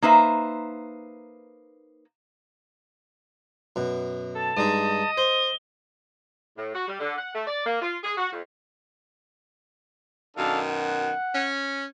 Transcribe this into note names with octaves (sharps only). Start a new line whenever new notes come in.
A#3 D#4 B4 C5 E5
F#2 B2
A4 A5
G2 G#3 D#4 D#5
C5 G7
A2
F#4
G3
D3
F#5
A3
D5
A#3
F4
G#4
F#4
F2
F#2 B2 D#3 D4 A4 F5
F#5
C#4